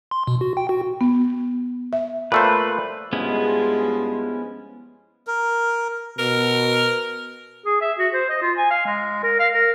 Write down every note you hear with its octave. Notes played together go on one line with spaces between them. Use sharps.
C6
B2
F#4
G5
F#4
B3
E5
A#2 A3 B4 C5
G2 F3 G#3 B3 C#4 E4
A#4
B2 A#4
G#4
E5
F#4
C5
D#5
F4
G#5
F5
G#3
A#4
F5
A#4